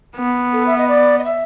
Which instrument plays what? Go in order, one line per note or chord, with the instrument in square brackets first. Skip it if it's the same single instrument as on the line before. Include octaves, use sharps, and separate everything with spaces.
[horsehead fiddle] B3
[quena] A4
E5
D#5
D5
D#5
E5